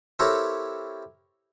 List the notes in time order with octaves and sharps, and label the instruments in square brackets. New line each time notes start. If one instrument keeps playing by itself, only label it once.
[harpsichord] C4 E4 G4 A4 A#4 C#5